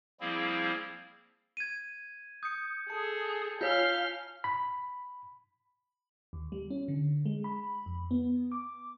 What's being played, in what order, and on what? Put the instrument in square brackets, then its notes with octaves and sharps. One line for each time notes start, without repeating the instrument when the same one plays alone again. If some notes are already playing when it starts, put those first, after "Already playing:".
[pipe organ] F3 G3 A#3 C4 E4 G#4
[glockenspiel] G#6 D#7
[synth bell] D#6 [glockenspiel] G6 C#7
[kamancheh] G#4 A4 [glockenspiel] A5 C#7
[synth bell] F4 C#5 G#5 [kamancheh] F5 F6 [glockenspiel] G6 B6 G7
[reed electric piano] B5
[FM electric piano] D#2
G3
C#4
D3
G#3
B5
F2
B3
D6